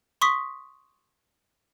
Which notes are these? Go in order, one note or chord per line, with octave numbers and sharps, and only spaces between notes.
C6 C#6 D#6 B6